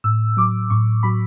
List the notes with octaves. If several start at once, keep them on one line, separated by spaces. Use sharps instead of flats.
A2 E6
F#3 D6
A2 C#6
F#3 B5